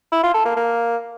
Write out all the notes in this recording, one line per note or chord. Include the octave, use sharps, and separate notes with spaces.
E4
F4
A4
A#3
A#3